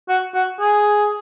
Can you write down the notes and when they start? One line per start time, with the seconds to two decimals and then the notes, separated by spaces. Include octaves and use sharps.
0.09 F#4
0.35 F#4
0.60 G#4